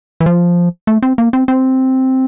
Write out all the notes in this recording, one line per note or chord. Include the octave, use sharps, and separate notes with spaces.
E3
F3
A3
C4
A#3
C4
C4